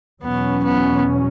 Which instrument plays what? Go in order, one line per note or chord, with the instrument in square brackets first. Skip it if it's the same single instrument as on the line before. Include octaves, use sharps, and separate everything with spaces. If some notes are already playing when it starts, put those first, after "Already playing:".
[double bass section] E2 B2 F#3 C#4 [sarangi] B3
[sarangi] B3